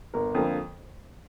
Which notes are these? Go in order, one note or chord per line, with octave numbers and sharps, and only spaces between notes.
G1 A#4
F2 D3 F3 A#3